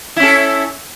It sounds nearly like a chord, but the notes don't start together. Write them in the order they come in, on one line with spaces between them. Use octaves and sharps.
E4 C#4 A4